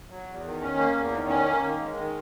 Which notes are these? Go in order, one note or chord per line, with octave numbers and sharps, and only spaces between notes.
F#3
E2
D#3
C#4
A#3
E2
D#3
C#4
A#3
D#3
G#3
D#3